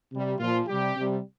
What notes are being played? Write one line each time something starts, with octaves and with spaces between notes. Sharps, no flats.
C3 G3
A#2 F3 F4
C3 G3 G4
C3 G3